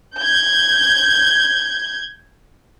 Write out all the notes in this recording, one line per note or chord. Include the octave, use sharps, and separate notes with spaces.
G6 G#6